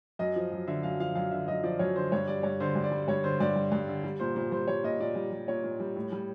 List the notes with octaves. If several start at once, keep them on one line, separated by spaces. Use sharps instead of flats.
F#2 D#5
F3
F#2
D3 E5
F#2 F5
F3 F5
F#2 F5
D3 E5
F#2 D#5
F3 D5
F#2 C#5
D3 C5
G2 C#5
G3 D5
G2 C#5
D3 C5
G2
D5
G3
G2 C#5
D3 C5
G2 D5
G3
G2
D3
G3
A#2 C5
A#2 C5
G3 C5
G3 C#5
A#2 D#5
A#2 D5
G3
G3
A#2 C#5
A#2
G3
A2
G3